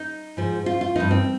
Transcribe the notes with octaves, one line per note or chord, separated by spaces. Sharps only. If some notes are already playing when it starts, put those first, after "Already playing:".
Already playing: D#4
G#2 F3
F4
F4
G2 F3 D#4
C4